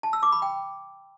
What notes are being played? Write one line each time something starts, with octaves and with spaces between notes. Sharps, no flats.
A5
E6
D6
B5
G5